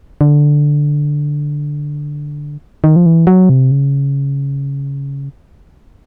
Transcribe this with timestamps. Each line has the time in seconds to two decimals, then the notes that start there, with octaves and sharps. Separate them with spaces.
0.21 D3
2.84 D#3
2.96 F3
3.06 E3
3.27 F#3
3.50 C3
3.71 C#3